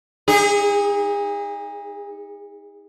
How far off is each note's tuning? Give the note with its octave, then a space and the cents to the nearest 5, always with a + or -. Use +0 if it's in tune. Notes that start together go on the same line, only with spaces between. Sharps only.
D#4 +25 G#4 -35